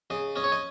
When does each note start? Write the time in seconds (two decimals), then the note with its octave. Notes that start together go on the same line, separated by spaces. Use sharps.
0.10 C#3 D#5
0.36 C#4 D#5
0.44 C#5
0.52 D#5